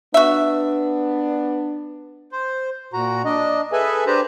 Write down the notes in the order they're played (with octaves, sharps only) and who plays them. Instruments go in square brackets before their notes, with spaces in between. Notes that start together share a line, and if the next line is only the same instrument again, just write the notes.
[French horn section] B3 D4 [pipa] F#4 E5
[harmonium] C5
A#2 F#4 A#5
D4 D#5
G#4 A4 B4 E5 G#5
D4 G4 B4 C5 A5 A#5